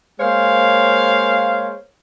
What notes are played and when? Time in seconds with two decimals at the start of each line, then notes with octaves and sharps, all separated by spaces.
0.20 G#3 A#3 C5 C#5 F5